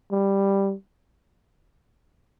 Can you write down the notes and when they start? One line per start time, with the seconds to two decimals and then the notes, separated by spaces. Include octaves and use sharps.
0.12 G3